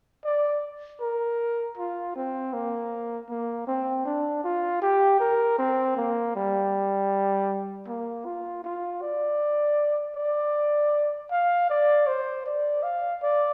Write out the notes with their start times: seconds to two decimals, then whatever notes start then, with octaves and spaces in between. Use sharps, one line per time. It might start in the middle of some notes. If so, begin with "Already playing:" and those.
0.25 D5
1.01 A#4
1.77 F4
2.16 C4
2.54 A#3
3.30 A#3
3.68 C4
4.06 D4
4.44 F4
4.82 G4
5.20 A#4
5.59 C4
5.97 A#3
6.35 G3
7.88 A#3
8.25 F4
8.64 F4
9.02 D5
10.16 D5
11.31 F5
11.70 D5
12.07 C5
12.46 D5
12.83 F5
13.22 D5